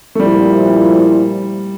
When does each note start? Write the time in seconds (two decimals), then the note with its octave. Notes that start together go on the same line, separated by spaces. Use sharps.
0.15 A3
0.19 A#2 F3 G3 C4 E4